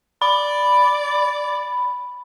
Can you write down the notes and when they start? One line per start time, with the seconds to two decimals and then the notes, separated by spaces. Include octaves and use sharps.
0.22 D5 B5